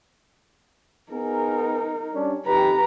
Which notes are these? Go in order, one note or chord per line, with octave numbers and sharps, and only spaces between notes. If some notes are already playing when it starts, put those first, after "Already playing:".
B3 D#4 G#4 A#4
G3 C#4 D4
F2 D#4 G4 B4 A#5